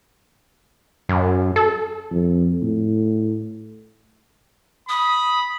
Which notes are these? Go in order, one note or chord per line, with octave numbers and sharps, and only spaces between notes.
F#2
A4
F2
A2
B5 D#6